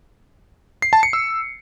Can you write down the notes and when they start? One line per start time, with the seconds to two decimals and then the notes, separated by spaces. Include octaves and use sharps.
0.82 C7
0.93 A5
1.03 C#7
1.13 E6